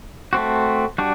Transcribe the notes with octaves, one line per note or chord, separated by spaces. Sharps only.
A3 C4 F#4
G3 D4 F#4